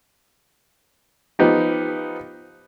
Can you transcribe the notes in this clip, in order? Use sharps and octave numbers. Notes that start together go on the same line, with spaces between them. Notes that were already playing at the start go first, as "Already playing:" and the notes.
F3 B3 D#4 G4